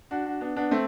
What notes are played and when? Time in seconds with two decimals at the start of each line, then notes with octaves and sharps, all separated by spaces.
0.11 D4 F#4
0.25 D4 F#4
0.41 B3 D4
0.56 B3 D4
0.71 A3 C4